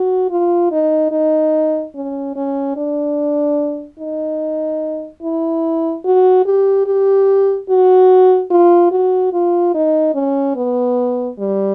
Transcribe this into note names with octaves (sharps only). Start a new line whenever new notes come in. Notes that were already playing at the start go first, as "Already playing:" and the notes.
Already playing: F#4
F4
D#4
D#4
C#4
C#4
D4
D#4
E4
F#4
G4
G4
F#4
F4
F#4
F4
D#4
C#4
B3
G3